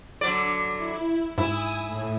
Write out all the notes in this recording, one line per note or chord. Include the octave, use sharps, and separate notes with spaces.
D3 F#3 D5
E4
G#2 E4 G#5 D#6 E6
A2